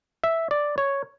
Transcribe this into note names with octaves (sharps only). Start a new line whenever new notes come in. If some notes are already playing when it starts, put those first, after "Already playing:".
E5
D5
C#5